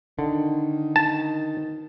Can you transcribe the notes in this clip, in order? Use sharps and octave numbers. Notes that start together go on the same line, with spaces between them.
D3 D#3
A5